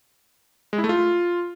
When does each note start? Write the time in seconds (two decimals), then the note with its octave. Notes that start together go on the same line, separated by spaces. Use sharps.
0.73 G#3
0.78 E4
0.84 A3
0.89 F4